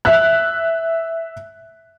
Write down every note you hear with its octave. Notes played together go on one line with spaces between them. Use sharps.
E5 F#6